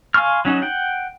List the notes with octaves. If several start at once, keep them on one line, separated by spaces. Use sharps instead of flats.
F5 G#5 C6 C#6 F6
F#3 C#4 D#4 F#4
F#5 G5